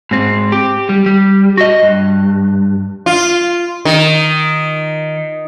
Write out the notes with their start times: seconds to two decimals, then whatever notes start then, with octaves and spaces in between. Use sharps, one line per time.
0.11 G#2 C4
0.52 G4
0.89 G3
1.06 G3
1.57 F#4 D#5
1.83 G2
3.06 F4
3.85 D#3